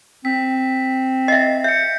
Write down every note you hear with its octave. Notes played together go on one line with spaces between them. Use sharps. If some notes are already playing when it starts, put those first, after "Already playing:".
C4 B6
D#5 E5 C7
E5 G6 C#7